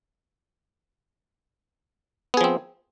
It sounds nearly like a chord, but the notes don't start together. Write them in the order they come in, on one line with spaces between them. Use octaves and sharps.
B3 G#4 F3 C4